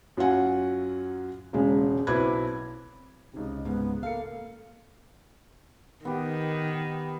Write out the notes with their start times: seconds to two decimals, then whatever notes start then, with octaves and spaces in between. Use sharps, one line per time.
0.17 F#2 F#3 F4 F#5 G#5
1.53 E1 C#3 G#3
2.07 B1 C4 E4 B4 D6 G#6
3.33 C#2 C3 D#4
3.65 G#2 B3
4.03 A#3 A4 F5 C#7
6.05 D#3 B3 G4